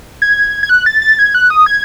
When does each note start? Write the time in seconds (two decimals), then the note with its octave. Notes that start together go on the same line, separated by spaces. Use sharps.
0.22 G#6
0.63 G#6
0.69 F#6
0.86 A6
1.02 A6
1.19 G#6
1.35 F#6
1.50 D#6
1.66 G#6